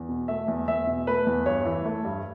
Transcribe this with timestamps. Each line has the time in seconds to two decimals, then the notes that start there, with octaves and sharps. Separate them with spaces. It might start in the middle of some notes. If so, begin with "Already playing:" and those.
Already playing: E2
0.09 B2
0.28 A3 E5
0.48 E2
0.67 E2 E5
0.87 B2
1.07 A3 B4
1.27 E2
1.46 G2 C#5
1.65 E3
1.85 A3
2.05 G2